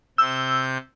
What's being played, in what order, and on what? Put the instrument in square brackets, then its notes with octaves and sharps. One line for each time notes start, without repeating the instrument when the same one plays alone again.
[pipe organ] C3 G6 [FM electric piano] E6